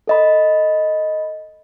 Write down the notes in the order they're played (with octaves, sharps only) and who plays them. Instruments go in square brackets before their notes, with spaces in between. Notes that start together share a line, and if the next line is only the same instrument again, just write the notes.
[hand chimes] A4 D#5 B5